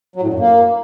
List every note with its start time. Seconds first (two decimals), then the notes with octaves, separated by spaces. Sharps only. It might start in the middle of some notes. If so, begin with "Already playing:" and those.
0.16 F#3
0.22 A2
0.28 D3
0.34 F#2
0.40 A#3